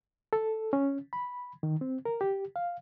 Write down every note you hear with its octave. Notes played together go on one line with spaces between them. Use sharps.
A4
C#4
B5
D#3
C4
A#4
G4
F5